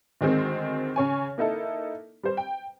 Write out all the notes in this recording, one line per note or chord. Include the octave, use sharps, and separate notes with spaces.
D2 D#3 G#3 C4
C#3 C#5 G#5
A#3 D#4 E4 A4
G3 C5
G5